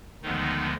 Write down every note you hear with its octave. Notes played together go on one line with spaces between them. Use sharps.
D2 D3 D#3 F3 G#3 B3 D#4